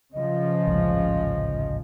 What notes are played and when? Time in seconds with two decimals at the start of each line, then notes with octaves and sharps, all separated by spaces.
0.14 C#3 F3 D#5
0.67 A1 D2 G#2